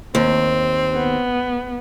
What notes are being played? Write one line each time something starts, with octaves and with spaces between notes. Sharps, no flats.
D#2 C4
B3